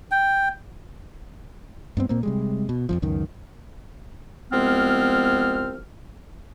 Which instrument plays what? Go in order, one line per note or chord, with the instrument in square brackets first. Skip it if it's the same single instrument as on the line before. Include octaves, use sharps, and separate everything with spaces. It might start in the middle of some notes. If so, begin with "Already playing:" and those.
[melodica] G5
[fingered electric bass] G2 B3 C4
A#2 A#3 C4
C3 G3 G#3
B2
F2 A2 F3
C#2 F#2 D#3
[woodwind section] C2 F3 G#3 B3 C4 F6